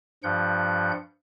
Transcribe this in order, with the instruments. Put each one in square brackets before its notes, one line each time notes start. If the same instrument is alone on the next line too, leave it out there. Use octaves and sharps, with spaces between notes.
[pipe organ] G2 F3 F#5 G6